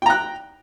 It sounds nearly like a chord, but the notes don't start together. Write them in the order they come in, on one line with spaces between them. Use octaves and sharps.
G5 A#5 F#6